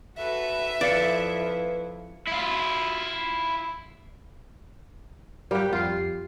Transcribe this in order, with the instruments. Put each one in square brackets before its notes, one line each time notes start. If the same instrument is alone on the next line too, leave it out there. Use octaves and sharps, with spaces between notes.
[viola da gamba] F#4 A4 B4 [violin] E5
[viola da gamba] F2 E4 [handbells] B4 F5 C#7 [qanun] D5
[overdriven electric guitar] E4 F4
[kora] G3 G4 [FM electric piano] A#4 F5 F#5
[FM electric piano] F2 G4 C7 [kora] F4